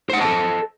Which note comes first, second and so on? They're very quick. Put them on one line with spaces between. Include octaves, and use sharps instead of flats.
C5 F#5 D#5 A5 A4